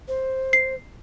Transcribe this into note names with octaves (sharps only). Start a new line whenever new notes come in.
C5
C7